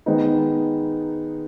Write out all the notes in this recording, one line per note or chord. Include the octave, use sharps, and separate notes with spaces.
D#3 G#3 B3 D#4